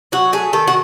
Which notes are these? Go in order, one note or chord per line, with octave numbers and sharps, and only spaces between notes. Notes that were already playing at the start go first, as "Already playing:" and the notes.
F#3 F#4
A3 G#4
D#3 A4
F#4